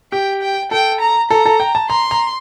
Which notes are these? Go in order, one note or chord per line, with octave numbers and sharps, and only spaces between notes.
G4 G5
G5
A4 G5
A#5
A4 A#5
A4
G5
A5
A#5 C6
A#5